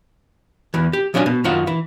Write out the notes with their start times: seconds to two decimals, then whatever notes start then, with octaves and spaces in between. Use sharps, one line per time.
0.74 E2 E3
0.93 G4
1.14 F3 F#3 C#4 D4 F#5 G#5
1.26 B2
1.44 F#2 D#3 F4 F#5
1.67 E3